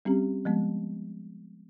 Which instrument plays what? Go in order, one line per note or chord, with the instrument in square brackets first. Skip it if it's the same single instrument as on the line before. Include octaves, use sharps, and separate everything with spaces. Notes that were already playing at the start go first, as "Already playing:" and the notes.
[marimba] G3 C4 C#4 G4
F3 G#3 B3